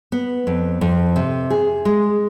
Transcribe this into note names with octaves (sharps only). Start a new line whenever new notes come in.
B3
F2
F2
C3
G#4
G#3